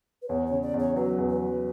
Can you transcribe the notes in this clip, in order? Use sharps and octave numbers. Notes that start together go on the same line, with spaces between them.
B4
E2 C#5
C#3 C#5
D5
E2
C#5
F#3 B4
E2
B4
F#3